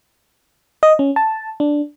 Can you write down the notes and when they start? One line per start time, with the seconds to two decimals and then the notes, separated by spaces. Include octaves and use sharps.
0.83 D#5
0.99 C#4
1.16 A5
1.60 D4